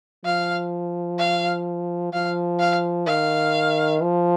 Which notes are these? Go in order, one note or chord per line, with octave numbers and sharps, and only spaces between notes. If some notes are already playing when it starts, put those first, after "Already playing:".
F3 F5
F5
F3 F5
F5
D#3 F5
F3